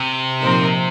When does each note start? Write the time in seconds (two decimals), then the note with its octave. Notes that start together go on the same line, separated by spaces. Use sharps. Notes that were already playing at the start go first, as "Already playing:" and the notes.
Already playing: C3
0.41 A#2 F3 C4 D#4 A#4